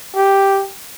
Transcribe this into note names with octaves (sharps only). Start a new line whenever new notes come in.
G4